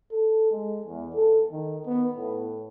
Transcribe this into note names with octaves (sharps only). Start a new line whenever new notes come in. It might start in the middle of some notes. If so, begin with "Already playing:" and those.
A4
G#3
E2
A4
D#3
B3
A2